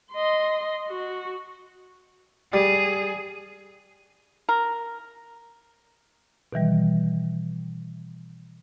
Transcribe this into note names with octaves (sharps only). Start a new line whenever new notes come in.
D#5 C6
F#4
G3 G#4
A#4
B2 D#3 E3 G3